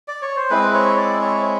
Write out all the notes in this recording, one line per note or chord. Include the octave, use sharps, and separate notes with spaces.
D5
C#5
C5
G#3 C4 E4 B4
C#5
D5
C#5